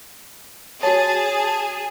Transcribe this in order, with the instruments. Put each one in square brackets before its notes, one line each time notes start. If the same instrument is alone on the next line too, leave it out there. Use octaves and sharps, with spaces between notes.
[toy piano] F#4 C#5 [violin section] G#4 [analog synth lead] A5